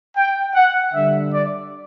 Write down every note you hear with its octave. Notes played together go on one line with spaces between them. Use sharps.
G5
F#5
D3 G3 E5
D5